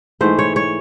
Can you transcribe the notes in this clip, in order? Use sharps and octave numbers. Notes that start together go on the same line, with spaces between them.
G#2 E3 A3 C5
C#5
C#5